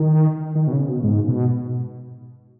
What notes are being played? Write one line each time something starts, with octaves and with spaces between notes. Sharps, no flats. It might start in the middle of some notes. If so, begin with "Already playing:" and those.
Already playing: D#3
D#3
B2
C#3
B2
G#2
B2